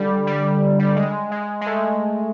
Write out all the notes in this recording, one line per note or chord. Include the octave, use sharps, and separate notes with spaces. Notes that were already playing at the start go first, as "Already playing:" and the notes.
Already playing: D3 G3
G3
G3
G#3
G#3
G#3
A3